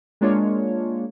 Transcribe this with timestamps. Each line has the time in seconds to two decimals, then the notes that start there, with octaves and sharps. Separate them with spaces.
0.21 G#3 A#3 D4 F4 C#5